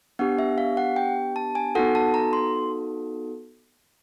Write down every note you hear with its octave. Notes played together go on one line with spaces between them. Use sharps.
B3 D4 G4 F#5
E5
F5
F#5
G5
A5
G#5
B3 D#4 F#4 A4 F#5
A5
A#5
C6